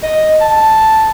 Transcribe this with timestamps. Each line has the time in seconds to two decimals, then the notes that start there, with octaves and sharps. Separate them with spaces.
0.03 D#5
0.41 A5